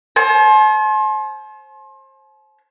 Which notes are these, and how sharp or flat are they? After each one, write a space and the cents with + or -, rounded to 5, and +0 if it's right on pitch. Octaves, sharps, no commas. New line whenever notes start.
C5 +30 A5 -45